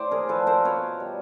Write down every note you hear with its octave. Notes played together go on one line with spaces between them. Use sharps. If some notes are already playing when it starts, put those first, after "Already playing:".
Already playing: A2 C5 D5
G#4 A#4
F3 A4 B4
A#4 C5
B2 B4 C#5
G3